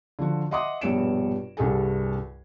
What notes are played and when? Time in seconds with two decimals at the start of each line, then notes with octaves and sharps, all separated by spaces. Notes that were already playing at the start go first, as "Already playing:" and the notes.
0.19 D3 F3 F#4
0.51 D#5 E5 F#5 C6 D6 D#6
0.81 A#1 G2 B2 C#5 D7 E7
1.57 C2 G2 F#4 G#4 A4 G#5